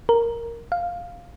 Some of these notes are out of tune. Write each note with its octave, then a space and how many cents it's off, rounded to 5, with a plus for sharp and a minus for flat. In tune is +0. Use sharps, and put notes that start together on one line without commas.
A#4 -5
F5 +5